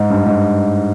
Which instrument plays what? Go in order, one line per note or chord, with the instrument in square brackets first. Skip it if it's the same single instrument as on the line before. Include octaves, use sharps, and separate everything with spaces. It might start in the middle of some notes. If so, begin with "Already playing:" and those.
Already playing: [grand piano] G#2
G2
G#2